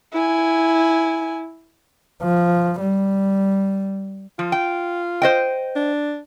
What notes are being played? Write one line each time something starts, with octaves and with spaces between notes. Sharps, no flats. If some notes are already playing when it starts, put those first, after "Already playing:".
E4 G#5
F3
G3
F3 F4
G5
C5 D#5 G5
D4